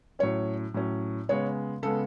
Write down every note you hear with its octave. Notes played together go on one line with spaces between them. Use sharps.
A2 F#3 C#4 C#5
A2 F#3 C#4
C#3 G#3 B3 C#5
C#3 G#3 B3 A4